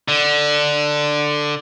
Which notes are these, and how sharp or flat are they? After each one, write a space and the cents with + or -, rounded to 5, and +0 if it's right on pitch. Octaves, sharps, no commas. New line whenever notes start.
D3 +10